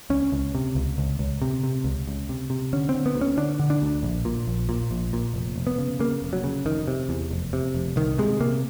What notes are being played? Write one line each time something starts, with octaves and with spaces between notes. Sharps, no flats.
C#2 C#4
C#2
C3
C#2
C#2
C#2
C3
C3
C#2
C#2
C3
C3
D3 C#4
C4
D3
B3
D2
C#4
D3 D4
D3
D4
D2
A#1
A#2
A#1
A#2
A#1
A#2
F1
F1
B3
C#3
C#3 A#3
F1
F#3
C#3
F1 D#3
C3
E2
F1
C3
F1
C2 D#3
C3 G#3
C3 A#3